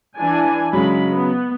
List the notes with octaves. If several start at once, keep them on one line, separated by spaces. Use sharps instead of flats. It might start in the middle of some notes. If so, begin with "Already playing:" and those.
E3 D4 G#5
C#3 F#3 G#3 B5
B3